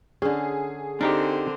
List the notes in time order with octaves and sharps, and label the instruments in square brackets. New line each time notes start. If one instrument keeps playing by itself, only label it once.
[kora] D3 C#4 [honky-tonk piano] G#4
[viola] D3 C4 [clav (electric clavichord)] D4 D#4 G4 [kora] A#4